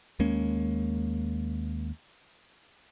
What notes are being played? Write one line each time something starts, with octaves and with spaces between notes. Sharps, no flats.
D#2 G#3 A#3 C#4